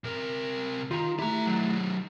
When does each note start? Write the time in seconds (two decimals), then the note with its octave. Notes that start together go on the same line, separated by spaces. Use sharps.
0.04 C3 A#4
0.91 D#3 F4 A#5
1.19 A3 E4 G4 A#5
1.46 D#3 F#3